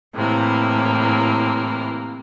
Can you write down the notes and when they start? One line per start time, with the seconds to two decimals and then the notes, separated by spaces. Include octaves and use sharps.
0.14 A2 C3 E3 A#3